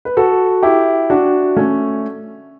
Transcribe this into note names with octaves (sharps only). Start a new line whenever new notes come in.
B4
F#4 A4
E4 G4
D4 F#4
A3 C#4